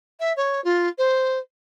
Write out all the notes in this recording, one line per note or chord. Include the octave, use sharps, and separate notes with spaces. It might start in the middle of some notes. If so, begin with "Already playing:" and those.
E5
C#5
F4
C5